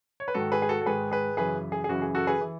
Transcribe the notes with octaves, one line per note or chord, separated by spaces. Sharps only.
C#5
B4
G#2 D#3 F#4 A4
G#4 B4
G#4
F#4 A4
A4
G#2 D#3 G#4 B4
G#4 B4
F#2 C#3 E3 G#4 B4
G#4
G#4
F#2 C#3 E3 F#4
G#4
F#4 A4
G#4 B4
E3